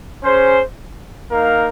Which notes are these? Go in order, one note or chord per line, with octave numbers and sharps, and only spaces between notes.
C#4 G#4 C5
A#3 D#4 A#4 F5